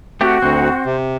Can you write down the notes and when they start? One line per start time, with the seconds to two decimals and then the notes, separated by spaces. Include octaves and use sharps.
0.21 A3 C4 F#4 G4
0.42 D2 C4
0.85 C3